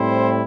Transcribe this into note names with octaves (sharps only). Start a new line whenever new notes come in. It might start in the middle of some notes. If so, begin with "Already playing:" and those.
Already playing: A2 G3 C4 E4 C5